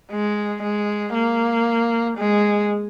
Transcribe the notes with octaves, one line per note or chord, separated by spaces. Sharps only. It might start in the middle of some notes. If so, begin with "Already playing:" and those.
G#3
G#3
A#3
G#3